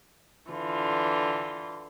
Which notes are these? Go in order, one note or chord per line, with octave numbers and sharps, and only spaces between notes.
D3 E3 F4